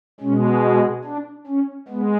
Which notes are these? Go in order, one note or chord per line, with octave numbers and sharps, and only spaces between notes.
B2 G#3 C#4
D4
C#4
G#3 B3